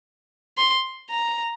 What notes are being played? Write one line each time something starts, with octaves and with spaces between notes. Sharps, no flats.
C6
A#5